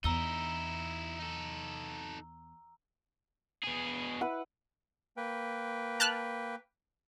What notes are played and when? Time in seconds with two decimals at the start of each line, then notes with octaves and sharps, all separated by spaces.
0.04 E2 D#4 E4 A#5 E6 G7
1.19 D#4 A4
3.64 B2 G#4
4.21 E4 B4 F#5
5.17 A#3 B4 G5
6.00 A5 F6 F#6